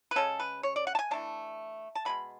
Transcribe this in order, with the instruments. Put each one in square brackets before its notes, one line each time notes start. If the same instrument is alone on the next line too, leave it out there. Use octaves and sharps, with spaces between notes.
[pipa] B4
C#3 G#3 C#4 A4
B4
C#5
D5
F#5
A5
G#5
E3 A3 D4 A5
A5
B2 G#3 B3 B5